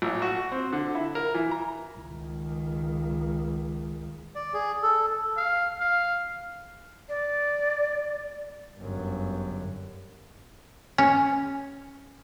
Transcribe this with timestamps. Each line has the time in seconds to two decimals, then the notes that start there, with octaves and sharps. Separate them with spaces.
0.02 A1
0.22 F#4
0.52 C4
0.73 D3
0.95 E4
1.15 A#4
1.35 E3
1.51 A#5
1.96 C#2 D#3
4.35 D5
4.53 G#4
4.83 A4
5.37 F5
5.79 F5
7.09 D5
8.78 G1 F#2
10.98 C#4